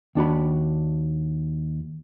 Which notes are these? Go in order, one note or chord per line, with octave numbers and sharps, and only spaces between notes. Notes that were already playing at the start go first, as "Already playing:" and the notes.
D#2 D4 F#4 B5